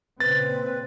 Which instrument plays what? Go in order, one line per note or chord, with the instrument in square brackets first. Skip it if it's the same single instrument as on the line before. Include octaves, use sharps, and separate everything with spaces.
[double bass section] A#2 C#3 C4 [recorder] B4 [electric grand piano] A6